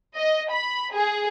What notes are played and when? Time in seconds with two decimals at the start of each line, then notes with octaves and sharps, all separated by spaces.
0.15 D#5
0.51 B5
0.94 G#4